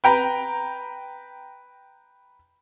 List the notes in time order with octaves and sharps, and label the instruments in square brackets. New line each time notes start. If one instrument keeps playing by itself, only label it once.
[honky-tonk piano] B4 G5 A#5 B5